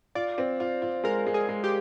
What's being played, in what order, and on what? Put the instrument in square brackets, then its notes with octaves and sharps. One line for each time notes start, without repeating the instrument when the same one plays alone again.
[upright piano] F4 [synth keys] D5
[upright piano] C4
F4
F4
[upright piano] G#3 [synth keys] A#4
[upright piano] G#3
[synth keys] G#4
[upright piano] G#3
[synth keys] G4